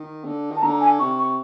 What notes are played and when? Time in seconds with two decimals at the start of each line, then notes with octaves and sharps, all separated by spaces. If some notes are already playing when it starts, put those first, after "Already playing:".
Already playing: D#3
0.25 D3
0.51 D#3
0.57 A5
0.62 D3 A#5
0.81 G#5
0.99 C3 C#6
1.19 C#6